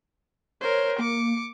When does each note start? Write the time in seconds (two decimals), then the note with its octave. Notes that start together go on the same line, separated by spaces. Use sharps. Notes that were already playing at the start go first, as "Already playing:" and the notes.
0.61 A#4 C5 C#5
0.99 A#3 D6 C#7